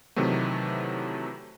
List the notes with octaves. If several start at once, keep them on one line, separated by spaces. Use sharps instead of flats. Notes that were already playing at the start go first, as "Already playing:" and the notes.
C3 D#3 E3 F#3 A3